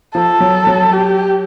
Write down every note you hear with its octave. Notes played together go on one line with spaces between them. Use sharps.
F3 A4
F#3
F#3
G4